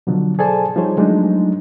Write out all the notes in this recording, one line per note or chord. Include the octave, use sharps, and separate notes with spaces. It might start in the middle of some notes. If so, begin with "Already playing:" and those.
B2 D3 F3 F#3
G#4 A4 C5 D5 G#5 A5
F3 G3 D#4 G#4 C5 C#5
F3 F#3 G#3 A3 D4 D#4